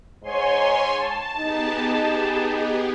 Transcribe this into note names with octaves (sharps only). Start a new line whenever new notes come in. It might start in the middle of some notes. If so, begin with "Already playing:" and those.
G#2 C#5 G#5 C6
A5
B3 D#4 G4 G#4